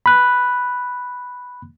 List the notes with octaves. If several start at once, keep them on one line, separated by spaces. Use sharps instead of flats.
B5 F#6